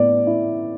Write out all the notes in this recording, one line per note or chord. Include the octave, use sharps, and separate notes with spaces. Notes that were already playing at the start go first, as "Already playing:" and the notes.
Already playing: A2 B3 D5
E4